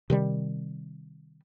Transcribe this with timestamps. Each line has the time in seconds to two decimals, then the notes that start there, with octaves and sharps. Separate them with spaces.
0.10 C3 D#3 G3